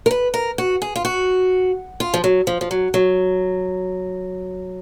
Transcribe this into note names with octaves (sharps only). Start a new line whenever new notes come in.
A#4
B4
A#4
F#4
G#4
F4
F#4
F4
F3
F#3
F3
F3
F#3
F#3